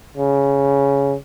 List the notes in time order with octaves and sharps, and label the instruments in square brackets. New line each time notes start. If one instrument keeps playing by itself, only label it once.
[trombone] C#3